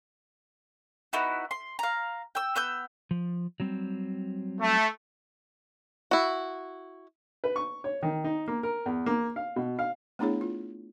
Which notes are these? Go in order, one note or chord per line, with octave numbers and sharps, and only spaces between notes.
B3 D#4 E4 F#4
C6
F5 A#5
G5 E6
B3 E6 G6
F3
F#3 G3 C4
A3
E4 F#4
B4
C#6
C#5
D#3
D#4
A#3
A#4
E2
A#3
F5
B2
F5
A3 B3 D4 E4 G#4 C#5
F4